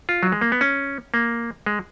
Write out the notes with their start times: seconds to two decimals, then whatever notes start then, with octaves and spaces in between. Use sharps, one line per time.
0.09 F4
0.23 F#3
0.32 G#3
0.41 A#3
0.52 B3
0.61 C#4
1.14 A#3
1.66 G#3